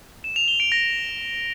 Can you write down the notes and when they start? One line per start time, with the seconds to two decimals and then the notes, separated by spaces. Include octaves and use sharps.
0.24 E7
0.36 F7
0.48 G7
0.60 D7
0.72 A#6